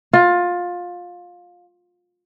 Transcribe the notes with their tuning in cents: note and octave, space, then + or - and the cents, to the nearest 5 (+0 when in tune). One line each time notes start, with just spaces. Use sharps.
F4 +20